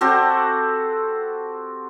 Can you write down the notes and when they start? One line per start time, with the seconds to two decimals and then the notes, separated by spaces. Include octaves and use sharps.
0.01 C4 F#4 G4 A4